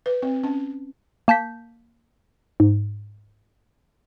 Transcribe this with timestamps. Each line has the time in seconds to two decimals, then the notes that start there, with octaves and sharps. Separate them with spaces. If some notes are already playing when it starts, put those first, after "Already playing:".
0.06 B4
0.22 C4
0.43 C#4
1.28 A#3 A5 G6 B6
2.60 G#2